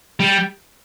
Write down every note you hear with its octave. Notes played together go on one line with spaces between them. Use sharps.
G3